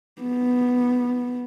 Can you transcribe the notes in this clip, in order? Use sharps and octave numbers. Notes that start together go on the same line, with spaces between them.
B3